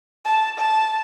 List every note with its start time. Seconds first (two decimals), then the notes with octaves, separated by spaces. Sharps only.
0.25 A5
0.58 A5